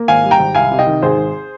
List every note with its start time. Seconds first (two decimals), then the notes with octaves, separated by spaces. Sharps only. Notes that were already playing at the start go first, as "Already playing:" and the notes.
Already playing: A#3
0.08 G#1 F5 G#5
0.24 G3
0.31 G5 A#5
0.39 G#1
0.55 C2 F5 G#5
0.71 C3
0.79 D#5 G5
0.86 D#3
1.02 G#1 G#4 C5
1.18 G#1